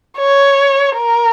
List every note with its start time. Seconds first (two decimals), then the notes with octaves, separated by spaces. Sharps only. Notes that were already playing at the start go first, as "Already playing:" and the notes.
0.18 C#5
0.97 A#4